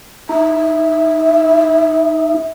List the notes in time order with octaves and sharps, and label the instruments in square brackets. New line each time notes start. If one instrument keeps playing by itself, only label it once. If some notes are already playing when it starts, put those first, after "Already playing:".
[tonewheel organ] D#4 [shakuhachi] E5